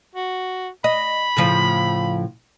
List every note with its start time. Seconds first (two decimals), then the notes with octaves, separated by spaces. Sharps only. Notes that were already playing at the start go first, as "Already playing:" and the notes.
0.15 F#4
0.84 D#5 B5
1.37 A2 C#3 F3